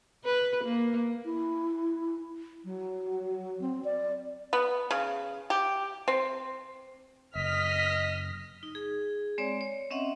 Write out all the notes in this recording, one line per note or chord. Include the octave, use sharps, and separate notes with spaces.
B4
A#3
E4
F#3
C4
D5
B3
C#3
G4
C4
F#1 D#5 F6 B6
D#4
G#4
G#3 C4 C#5 D5
C#5
C4 C#4 D#5 E5 F#5